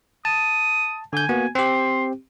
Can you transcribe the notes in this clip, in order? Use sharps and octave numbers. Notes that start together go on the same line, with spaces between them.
A5 D#6
D3 G#5 G6
A#3 B3 F#4
C4 G4 C6